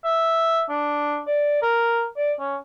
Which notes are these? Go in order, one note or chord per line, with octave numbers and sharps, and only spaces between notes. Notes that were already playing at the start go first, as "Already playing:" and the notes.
E5
D4
D5
A#4
D5
C#4